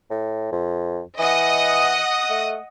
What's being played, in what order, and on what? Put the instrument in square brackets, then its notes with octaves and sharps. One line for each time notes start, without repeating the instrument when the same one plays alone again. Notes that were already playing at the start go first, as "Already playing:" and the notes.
[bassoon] A2
F2
[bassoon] E3 [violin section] D#5 F#5 D#6
[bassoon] A3